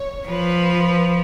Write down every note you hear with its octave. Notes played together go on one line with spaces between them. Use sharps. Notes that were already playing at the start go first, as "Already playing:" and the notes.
Already playing: C#5
F3 B4